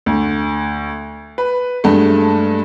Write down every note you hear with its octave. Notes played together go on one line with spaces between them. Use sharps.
D2
B4
G2 G#3 A3